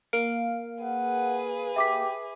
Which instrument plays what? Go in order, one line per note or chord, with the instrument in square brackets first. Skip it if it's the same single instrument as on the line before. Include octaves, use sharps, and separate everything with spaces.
[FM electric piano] A#3 F5 [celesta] D7
[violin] G#4 B4 [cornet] F#5
[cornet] G4 [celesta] E5 D6 B6